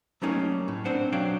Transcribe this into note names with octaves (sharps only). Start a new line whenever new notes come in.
F#3 G3 A3 A#3 C#4 D#4
A2
C4 D4 D#4 C5 F#5
B1 F#3 D4 F5 G5